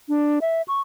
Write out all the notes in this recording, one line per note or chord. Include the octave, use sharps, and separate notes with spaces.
D4
E5
C#6